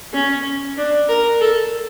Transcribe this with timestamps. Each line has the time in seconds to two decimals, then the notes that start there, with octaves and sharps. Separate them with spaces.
0.13 C#4
0.77 D4
1.09 A#4
1.41 A4